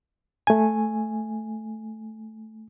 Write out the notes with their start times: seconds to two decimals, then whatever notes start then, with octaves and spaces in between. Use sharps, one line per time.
0.47 A3 G#5